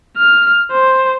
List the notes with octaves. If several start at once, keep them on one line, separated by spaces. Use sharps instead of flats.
F6
C5